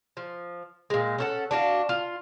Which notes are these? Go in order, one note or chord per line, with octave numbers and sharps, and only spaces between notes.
F3
A#2 G#3
C#4 A4 F#5
D4 F#4 F5
F4